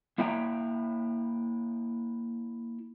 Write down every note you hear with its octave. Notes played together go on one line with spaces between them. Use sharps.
A#3 E4 E5 G5 G#5 A#5